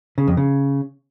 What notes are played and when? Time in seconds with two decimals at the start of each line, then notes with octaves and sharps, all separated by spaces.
0.18 C#3
0.27 F2
0.37 C#3